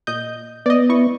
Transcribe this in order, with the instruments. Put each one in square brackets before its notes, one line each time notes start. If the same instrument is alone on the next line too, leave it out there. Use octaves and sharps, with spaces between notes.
[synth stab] A#2 D#5 G6
[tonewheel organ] B3 [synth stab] D5 D#5
[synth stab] E4 C#6